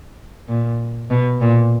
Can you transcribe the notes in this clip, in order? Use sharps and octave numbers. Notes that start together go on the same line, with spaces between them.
A#2
B2
A#2